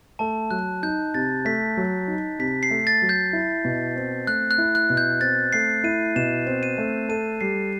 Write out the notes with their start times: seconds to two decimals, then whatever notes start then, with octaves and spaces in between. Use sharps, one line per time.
0.19 A3 A5
0.51 F#3 F#6
0.83 D#4 G6
1.14 C3 A6
1.45 A3 B6
1.77 F#3
2.08 D#4
2.39 C3 B6
2.63 C7
2.70 A3
2.87 A6
3.02 F#3
3.09 G6
3.33 E4
3.65 B2
3.96 C4
4.27 A3 F#6
4.51 F#6
4.58 E4
4.75 F#6
4.90 B2
4.97 G6
5.21 C4 A6
5.53 A3 C7
5.84 E4 D#7
6.16 B2 E7
6.46 C4
6.63 D#7
6.78 A3
7.09 A4 D#7
7.41 G3 C7